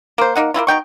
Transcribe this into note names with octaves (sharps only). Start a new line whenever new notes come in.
A#3 C5
A#3 B3 D#4 F#5
A#3 C4 E4 F4
B2 D#4 G5 C#6